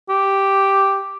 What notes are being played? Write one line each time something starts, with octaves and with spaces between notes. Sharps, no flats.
G4